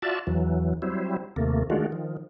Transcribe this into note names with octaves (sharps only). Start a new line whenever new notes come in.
F4 F#4 D5 E5 A5
E2 E3 F#3
F#3 G3 C4 E4
D#2 C3 A3 A#3
D#3 G#3 A3 D4 F4 F#4
D#3 F3